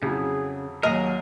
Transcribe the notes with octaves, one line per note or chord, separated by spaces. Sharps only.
F2 C#3 F#3 E4 G#4
D#2 F#3 G#4 A#4 D#5